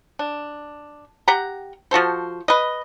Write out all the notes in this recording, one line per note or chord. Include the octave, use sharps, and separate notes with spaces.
D4
G4 F#5 A#5
F3 F#4 A4 C5
B4 D#5